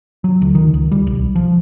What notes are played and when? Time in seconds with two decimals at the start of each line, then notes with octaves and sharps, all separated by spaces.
0.24 F#3
0.42 D2
0.55 D#3
0.74 C#2
0.91 G3
1.07 B1
1.35 F3